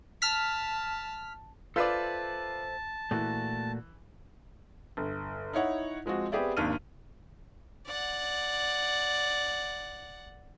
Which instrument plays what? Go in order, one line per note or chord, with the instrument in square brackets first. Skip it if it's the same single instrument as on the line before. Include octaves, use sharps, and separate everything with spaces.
[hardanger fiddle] A5 [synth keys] F6 B6
[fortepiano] F4 B4 D5 [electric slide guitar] A4 C5 E5 [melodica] A5
[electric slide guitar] A#2 A3 F#4 [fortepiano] E3
[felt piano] G1
D#4 E4 C#5 F#5
F3 G#3 C4 F#4
B3 C4 G4 G#4 D5 E5
G#1 D#2 D4 F6 D#7
[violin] D5 F#5